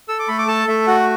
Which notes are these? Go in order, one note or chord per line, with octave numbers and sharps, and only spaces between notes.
A4 E6
D6
A3 B5
D6
A4 A5
A3 E5
F#4 F#5